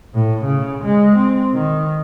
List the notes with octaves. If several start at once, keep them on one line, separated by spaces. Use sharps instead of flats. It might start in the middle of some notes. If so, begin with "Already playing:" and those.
A2
C#3
G#3
C4
D#3